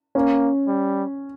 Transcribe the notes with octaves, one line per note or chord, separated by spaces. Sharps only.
A#3 C#4
G3